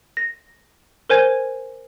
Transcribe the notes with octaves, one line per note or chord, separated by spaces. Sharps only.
A#6
A#4 C5 G#5 G#6